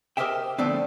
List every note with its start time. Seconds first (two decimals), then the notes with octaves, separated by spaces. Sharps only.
0.17 G4 A#4 C5 D#5 E5 G5
0.58 D3 F3 A3 B3 C4 D4